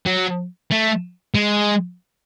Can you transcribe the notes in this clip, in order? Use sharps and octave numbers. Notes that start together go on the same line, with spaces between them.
F#3
A3
G#3